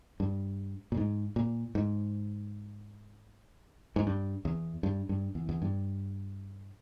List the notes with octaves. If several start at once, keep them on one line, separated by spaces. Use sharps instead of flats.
G2
A#2
G#2
A#2
G#2
G#2
G2
E2
G2
G2
E2
E2
G2